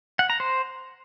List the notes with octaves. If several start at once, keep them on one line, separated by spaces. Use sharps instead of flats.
F#5
A#5
C5